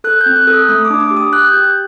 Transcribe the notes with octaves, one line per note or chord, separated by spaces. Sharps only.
A4 F#6
G6
C4
F#6
A4
D#6
A3 D#6
D6
D4
D6
G4
D#6
G4 F#6
G6
G4
G6